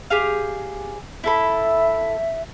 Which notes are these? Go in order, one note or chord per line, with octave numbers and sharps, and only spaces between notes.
G4 G#4 F5
E4 A4 E5 B5